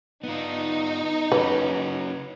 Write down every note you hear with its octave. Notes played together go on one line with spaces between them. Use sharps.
B3 D#4 F4
C#3 C#4 F#4 B4